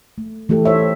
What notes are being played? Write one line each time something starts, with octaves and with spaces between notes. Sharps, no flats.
A3
E3 A3 G4 A4
D#4 G4 A4 C5 C#5 E5